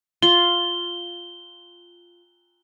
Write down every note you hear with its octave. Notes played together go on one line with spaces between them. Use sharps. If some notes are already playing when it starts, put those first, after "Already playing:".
F4 G7